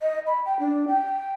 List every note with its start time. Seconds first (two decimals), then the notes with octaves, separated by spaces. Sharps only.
0.01 D#5
0.27 B5
0.46 G5
0.59 D4
0.88 G5